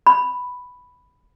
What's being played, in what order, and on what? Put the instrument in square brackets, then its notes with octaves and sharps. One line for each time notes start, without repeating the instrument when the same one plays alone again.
[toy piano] B5